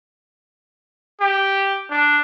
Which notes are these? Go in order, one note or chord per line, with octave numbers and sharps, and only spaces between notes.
G4
D4